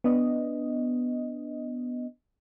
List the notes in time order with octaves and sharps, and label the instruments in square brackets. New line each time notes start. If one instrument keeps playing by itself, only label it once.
[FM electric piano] B3 D4 D#5